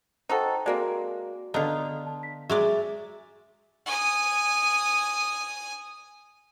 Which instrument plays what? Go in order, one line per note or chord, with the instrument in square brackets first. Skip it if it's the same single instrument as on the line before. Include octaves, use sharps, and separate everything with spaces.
[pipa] D#4 F#4 A4 [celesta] C5 G5
[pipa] G#3 A#3 C4 [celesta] F#4 D5
[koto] D3 B3 [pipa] D4 D#4 F4 [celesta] D#5
[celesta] A5
B6
[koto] F#3 G#3 D5 [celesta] E5
[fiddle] G#5 D#6